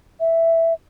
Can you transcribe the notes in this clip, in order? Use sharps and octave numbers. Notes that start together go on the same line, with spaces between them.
E5